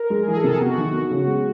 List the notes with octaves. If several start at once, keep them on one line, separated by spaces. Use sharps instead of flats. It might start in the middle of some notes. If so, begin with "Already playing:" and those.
Already playing: A#4
G#3
G#4
E3
A4
C3
B3 F#4
D#3
B3
C#3
G#3